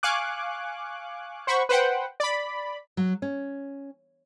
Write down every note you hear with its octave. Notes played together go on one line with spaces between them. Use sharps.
F5 G#5 C#6 D6 F#6
C5 F#5 B5 C#6
B4 C5 F#5 G5
D5 B5
F#3
C#4